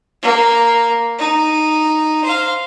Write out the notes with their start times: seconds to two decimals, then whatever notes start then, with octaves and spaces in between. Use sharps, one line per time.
0.22 A#3
1.19 D#4
2.24 C5 F5